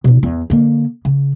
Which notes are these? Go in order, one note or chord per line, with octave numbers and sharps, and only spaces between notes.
B2 D#4
E2
D3 A#3
C#3